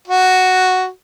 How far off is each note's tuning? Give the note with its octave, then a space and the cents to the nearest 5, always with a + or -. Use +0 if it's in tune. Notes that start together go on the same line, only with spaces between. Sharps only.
F#4 +0